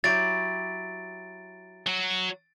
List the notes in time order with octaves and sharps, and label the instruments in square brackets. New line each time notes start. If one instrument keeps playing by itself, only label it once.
[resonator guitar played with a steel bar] F#3 E4 G4 [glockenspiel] A6 D7
[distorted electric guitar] F#3 F#4